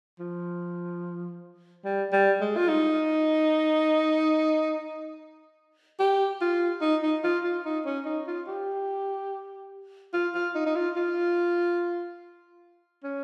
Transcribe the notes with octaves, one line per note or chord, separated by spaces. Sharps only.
F3
G3
G3
G#3
F4
D#4
G4
F4
D#4
D#4
F4
F4
D#4
C#4
D#4
F4
G4
F4
F4
D#4
D#4
F4
F4
C#4